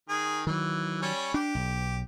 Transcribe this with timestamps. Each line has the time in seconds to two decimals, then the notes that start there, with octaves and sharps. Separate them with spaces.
0.09 D#3 G#4
0.47 D#3 E3 F#3
1.02 G3 C#4 C#5
1.34 D4 G4
1.55 B1